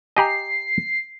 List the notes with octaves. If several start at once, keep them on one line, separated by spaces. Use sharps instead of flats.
G4 D#5 G#5 A#5 C7